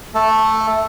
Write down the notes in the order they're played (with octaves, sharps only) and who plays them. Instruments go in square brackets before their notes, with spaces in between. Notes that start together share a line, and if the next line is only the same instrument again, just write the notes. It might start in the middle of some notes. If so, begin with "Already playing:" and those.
[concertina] A3 A4